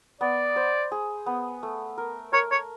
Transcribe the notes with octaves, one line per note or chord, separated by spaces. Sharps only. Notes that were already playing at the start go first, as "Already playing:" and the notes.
B3 D5
C5
G#4
B3
A3
A#4
A#4 C#5
C#5